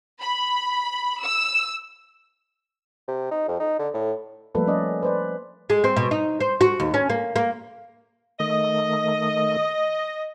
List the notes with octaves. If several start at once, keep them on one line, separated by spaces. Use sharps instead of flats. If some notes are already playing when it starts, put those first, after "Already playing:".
B5
E6
C3
D#4
F2
D#4
D3
A2
F3 G3 A3 A#3 A4 B4
C#4 D5 D#5
B4 C5 D5
G#3
C4
B2
D#4
C5
F#4
D#2
C#4
A#3
A#3
D#3 A3 D#5